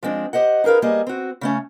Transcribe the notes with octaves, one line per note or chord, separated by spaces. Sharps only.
F3 G#3 C4 D4
G4 C5 D#5 F#5
D#4 G#4 A#4 B4 F5
G3 A#3 G#4 D#5
C4 F#4
C#3 A3 C#4